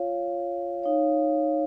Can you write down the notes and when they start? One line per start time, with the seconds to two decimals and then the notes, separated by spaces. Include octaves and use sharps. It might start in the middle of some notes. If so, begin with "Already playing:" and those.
Already playing: F4 C#5 F5
0.82 D#4 C#5 F5